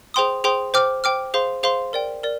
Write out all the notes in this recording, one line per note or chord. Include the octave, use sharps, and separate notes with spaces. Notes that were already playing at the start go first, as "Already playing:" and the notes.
G#4 C5 G5 C6 D#6
G#4 C5 G5 C6 D#6
C5 G5 D6 F6
C5 G5 D6 F6
G#4 C5 F5 C6
G#4 C5 F5 C6
A#4 D5 G5
A#4 D5